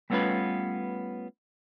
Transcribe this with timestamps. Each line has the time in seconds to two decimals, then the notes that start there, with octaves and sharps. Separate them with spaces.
0.10 G3 A3 B3 C#4 F4 B4